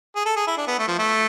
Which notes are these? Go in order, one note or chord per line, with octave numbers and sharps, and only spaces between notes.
G#4
A4
G#4
E4
D4
B3
A3
F3
A3